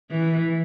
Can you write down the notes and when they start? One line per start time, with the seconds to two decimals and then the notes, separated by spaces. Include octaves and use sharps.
0.10 E3